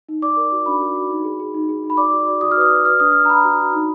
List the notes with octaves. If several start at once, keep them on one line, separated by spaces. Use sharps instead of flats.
D#4
D5 D6
A#4
F#4
D4 B5
F#4
F#4
D#4
G#4
G#4
D#4
G#4
D#4
B5
D5 D6
F#4
D5
F#4 D#6
F6
B4 D#6
D5
B4 F6
D4 D#6
D4 F6
A#5
B4 B5
F#4
F#4
D#4